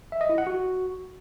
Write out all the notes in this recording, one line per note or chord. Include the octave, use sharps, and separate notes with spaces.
E5
D#5
E4
F#5
F#4